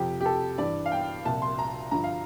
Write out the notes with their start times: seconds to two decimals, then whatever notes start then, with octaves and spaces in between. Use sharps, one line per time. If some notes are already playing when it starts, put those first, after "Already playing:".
Already playing: F2 C3 F3 G4
0.21 G4
0.26 A4
0.58 G2 E3 D5
0.86 F5
0.92 G5
1.25 C2 A#2 F3 A5
1.42 C6
1.59 A#5
1.91 G2 D3 F3 A#5
2.04 F5